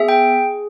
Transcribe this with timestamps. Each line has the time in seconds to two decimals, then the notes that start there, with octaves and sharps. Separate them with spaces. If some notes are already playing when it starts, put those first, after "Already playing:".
Already playing: B3 G#4 E5
0.09 G5